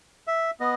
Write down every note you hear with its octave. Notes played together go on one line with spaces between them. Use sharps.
E5
B3 D#5